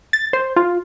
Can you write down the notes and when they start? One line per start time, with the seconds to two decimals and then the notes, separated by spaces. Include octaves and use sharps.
0.13 A6
0.33 C5
0.56 F4